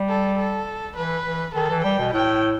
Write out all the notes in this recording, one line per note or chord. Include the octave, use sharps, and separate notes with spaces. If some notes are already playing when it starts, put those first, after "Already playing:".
Already playing: G3
A4
A4
E3 B4
E3
D#3 A4
E3
G3 G5
B2
A2 G5